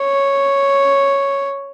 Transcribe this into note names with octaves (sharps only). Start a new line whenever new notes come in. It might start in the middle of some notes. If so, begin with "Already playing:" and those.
Already playing: C#5